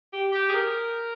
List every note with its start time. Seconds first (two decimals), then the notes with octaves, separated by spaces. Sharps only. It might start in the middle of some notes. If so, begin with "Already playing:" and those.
0.11 G4
0.33 G4
0.50 G#4
0.53 A#4